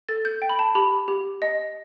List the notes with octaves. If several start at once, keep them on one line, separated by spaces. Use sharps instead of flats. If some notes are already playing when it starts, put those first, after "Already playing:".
A4 A6
G6
G5
B5
A5
G4 B5
G4
D#5